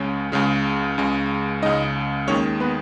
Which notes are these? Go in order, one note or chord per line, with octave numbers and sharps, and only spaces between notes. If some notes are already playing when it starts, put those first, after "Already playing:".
Already playing: C#2 C#3 G#3 C#4
C#2 C#3 G#3
C#2 C#3 G#3
C#2 C#3 G#3 D#4 D#5
D#2 D#3 G#3 C#4 C#5
B3 B4